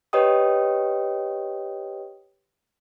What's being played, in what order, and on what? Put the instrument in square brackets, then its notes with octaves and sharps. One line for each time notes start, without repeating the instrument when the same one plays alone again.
[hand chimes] G4 B4 C#5 D#5 G5 D#6